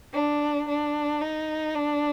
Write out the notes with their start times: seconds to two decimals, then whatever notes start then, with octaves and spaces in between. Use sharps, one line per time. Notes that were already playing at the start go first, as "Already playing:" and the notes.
0.13 D4
0.68 D4
1.21 D#4
1.75 D4